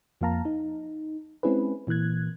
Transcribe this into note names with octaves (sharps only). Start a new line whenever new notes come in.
F2 F3 A#3 F5 A5 A#5
D#4
G#3 C4 C#4 E4 G#4 B4
A#2 E3 A#3 F#6 G#6